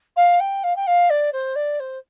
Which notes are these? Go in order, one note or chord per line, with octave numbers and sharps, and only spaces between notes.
F5
G5
F5
G5
F5
D5
C5
D5
C5